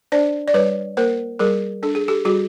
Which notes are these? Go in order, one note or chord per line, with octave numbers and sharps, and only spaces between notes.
D4 C5 D5
D5
G3 B4 C#5
A#3 A#4 C5
G3 G#4 A#4
D4 A4
G#4
G4 A4
G3 F#4 G#4